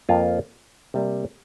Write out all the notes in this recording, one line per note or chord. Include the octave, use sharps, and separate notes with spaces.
F2 F3 A#3 F4
C3 G3 A#3